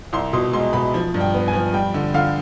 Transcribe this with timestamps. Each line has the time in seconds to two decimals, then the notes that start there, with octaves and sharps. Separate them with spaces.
0.13 C2 C6
0.33 B2 C6
0.53 G#3 C6
0.73 B2 B5
0.94 F3
1.14 G2
1.20 G5
1.34 B3
1.48 G#5
1.53 F3
1.73 G3 G5
1.94 D3
2.14 D3 F5